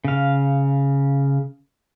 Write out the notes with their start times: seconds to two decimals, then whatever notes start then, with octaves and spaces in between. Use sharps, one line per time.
0.04 C#3 F5